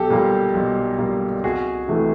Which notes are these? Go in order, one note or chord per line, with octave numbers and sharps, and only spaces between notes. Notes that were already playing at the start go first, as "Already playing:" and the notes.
Already playing: B1 G4 A4
A#2 G3 A#3
B1
A#2 G3 A#3
C2 F#4 G#4
C3 E3 A3